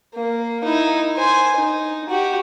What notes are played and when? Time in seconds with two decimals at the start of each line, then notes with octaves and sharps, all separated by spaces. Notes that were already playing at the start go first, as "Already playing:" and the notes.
0.15 A#3
0.64 D#4 E4
1.15 C5 G#5
1.56 D#4
2.10 F#4 G4